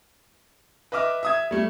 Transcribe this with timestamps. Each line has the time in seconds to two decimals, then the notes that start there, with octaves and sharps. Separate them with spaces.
0.92 B4 D#5 E5 D6 F6
1.23 E5 D#6 G#6
1.51 G3 A3